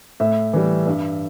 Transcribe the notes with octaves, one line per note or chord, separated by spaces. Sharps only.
A2 E5
E3 G3
G2